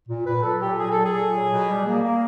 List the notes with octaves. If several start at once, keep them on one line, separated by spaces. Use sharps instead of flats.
A#2
A#2 B4
F#3 A4
A#2 G4
F#3 G#4
A#2 A4
G#4
A#2
F#3
B2
G3
A#3
A#3